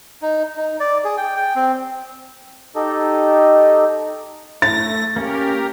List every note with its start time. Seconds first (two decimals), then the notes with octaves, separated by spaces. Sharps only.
0.22 D#4
0.57 D#4
0.80 D5
1.05 G#4
1.17 G5
1.36 G5
1.56 C4
2.76 D#4 G4 A4 D#5
4.62 A3 A6 A#6
5.16 A#3 C#4 G4 A#4